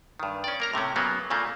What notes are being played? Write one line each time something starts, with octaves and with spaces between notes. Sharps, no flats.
G2 D#3
C#4 D5
A#3 A#4 A#5
A2 C3 A3 C#4
C#3 F#3 A#3 B3
A#2 C#3 A3 A#3